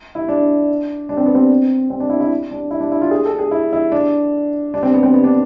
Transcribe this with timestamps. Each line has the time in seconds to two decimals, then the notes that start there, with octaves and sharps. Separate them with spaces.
0.15 E4
0.28 D4
1.09 D4
1.17 C4
1.26 B3
1.35 C4
1.90 C4
2.00 D4
2.10 E4
2.20 E4
2.51 D4
2.71 E4
2.80 D4
2.92 E4
3.02 F4
3.11 G#4
3.25 A4
3.39 G#4
3.51 E4
3.73 E4
3.92 D4
4.74 D4
4.83 C4
4.94 B3
5.03 C4
5.14 B3
5.24 D4